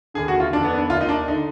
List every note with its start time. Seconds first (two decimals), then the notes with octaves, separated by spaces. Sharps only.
0.14 D#2 D3 G#4
0.28 F#4
0.40 F4
0.53 F2 D#3 D4
0.64 B3
0.78 D4
0.90 D#2 D#3 F4
1.01 D#4
1.09 D4
1.28 D3 D#4